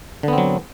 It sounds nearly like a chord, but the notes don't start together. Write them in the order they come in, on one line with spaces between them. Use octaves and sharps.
D3 B3 C4 F#3